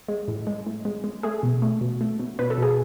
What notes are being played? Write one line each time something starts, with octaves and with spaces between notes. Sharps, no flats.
G#3
A2
G#3
A2
G#3
G#3
A3 G#4
B2
A3
B2
A3
B2
B2 B4
A4
B2 G#4